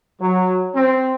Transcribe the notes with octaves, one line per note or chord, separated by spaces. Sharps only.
F#3
C4